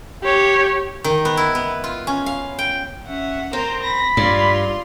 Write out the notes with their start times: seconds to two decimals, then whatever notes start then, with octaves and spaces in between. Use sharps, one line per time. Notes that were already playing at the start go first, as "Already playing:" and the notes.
0.23 G4 C#5
1.04 D#3
1.25 B3
1.37 E4
1.55 B3
1.84 F4
2.07 C#4
2.26 F5
2.59 G5
3.07 C#4 E5 F#5
3.53 C4 A#4 C5 A#5
3.83 B5 A#6
4.17 G2 F4 D5 C6